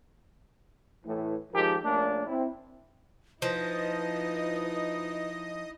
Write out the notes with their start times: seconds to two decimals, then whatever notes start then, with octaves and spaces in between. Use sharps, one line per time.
1.05 A2 E3
1.53 D#3 F3 G#3 G4 A4 A#4
1.84 A#1 A3 A#3 C#4 D4
2.27 C4 E4
3.42 F3 D#4 E4 B4 D#5 D#6